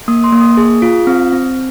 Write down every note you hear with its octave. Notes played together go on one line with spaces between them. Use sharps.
A#3 D#6
C6
A#3
D#6
G#4
F4
C4
C4